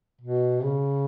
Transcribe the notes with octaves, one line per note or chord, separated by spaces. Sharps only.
B2
C#3